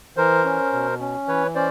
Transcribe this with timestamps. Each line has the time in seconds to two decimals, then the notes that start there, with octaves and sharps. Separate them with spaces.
0.17 E3 A#4 C5
0.45 C#4
0.72 B2
1.00 C#4
1.28 E3 B4 C#5
1.55 C#4 C5 D5